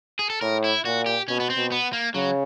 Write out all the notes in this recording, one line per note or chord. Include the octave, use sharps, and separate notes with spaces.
G#4
A4
A2 A#4
E4
A#2 F#4
G4
B2 C#4
B3
C4
B2
B3
A#3
C#3 F#3